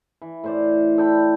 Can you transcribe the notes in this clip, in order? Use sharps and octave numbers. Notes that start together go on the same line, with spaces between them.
E3
A2 C5 D5
A4 D5 G5 B5